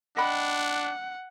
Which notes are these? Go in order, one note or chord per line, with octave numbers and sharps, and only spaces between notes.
D4 D#5 F#5 G5 B5